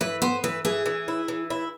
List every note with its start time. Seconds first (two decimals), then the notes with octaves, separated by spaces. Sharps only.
0.01 E3 B4
0.22 B3 C5
0.44 E3 B4
0.65 E3 G#4
0.86 E3
1.08 E4
1.28 E3
1.50 E4